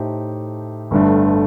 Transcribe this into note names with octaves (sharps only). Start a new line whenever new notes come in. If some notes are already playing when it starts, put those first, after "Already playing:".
Already playing: A2 A3 D#4 G4 C5
G1 G2 D3 A3